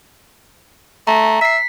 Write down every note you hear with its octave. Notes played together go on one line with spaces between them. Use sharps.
A3 A#5
E5 B6 C7